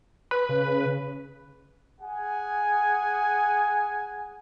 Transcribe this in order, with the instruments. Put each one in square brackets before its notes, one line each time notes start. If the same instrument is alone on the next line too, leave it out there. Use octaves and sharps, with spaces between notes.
[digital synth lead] B4
[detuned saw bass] C#3
[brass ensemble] G#4 F#5 G#5